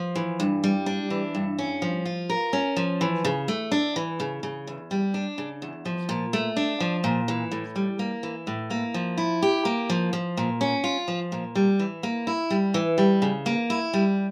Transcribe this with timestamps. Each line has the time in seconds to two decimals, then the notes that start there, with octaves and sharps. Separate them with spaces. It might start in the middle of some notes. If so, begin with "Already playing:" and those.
Already playing: F3
0.16 E3
0.40 G2
0.64 G3
0.86 D4
1.10 E3
1.35 G2
1.58 C#4
1.82 F3
2.05 F4
2.30 A#4
2.53 C#4
2.76 F3
3.01 E3
3.25 C#3
3.48 A3
3.72 D4
3.96 E3
4.20 C#3
4.43 C#3
4.67 E2
4.91 G3
5.14 D4
5.38 C#3
5.62 E2
5.85 F3
6.09 A#2
6.33 A3
6.56 D4
6.80 F3
7.04 A#2
7.28 E3
7.52 A2
7.76 G3
7.99 A#3
8.23 E3
8.47 A2
8.70 A#3
8.94 F3
9.18 E4
9.42 G4
9.65 A#3
9.90 F3
10.13 F3
10.37 A#2
10.61 C#4
10.84 F4
11.08 F3
11.32 A#2
11.55 G3
11.79 E3
12.03 A#3
12.27 E4
12.50 G3
12.74 E3
12.98 G3
13.22 C#3
13.46 A#3
13.70 E4
13.93 G3